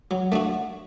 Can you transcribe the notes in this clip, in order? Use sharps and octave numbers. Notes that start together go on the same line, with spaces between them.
F#3
A3 D4 F#4